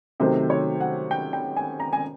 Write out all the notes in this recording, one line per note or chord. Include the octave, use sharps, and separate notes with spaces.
C3 D#3 F#3 A3 C4 C5
C#5
F#5
G5
G5
G#5
A#5
G#5